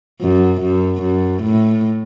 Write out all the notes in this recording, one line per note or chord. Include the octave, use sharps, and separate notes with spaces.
F#2
F#2
F#2
A2